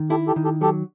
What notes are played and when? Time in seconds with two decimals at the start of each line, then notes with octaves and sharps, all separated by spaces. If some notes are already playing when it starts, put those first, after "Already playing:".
Already playing: D#3
0.10 E4 G4 A4
0.27 G4 A4
0.36 D#3
0.44 G4 A4
0.61 F#3 G4 A4